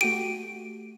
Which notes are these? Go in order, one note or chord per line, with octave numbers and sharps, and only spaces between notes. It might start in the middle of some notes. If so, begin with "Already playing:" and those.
A3 F#4 G4 D7 D#7